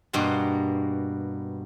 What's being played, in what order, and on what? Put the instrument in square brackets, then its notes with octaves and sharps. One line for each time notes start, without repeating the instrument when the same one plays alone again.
[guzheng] G2 B2 A#3 C6